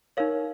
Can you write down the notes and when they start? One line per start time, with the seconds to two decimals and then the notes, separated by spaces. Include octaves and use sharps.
0.17 D#4 A#4 C#5 F5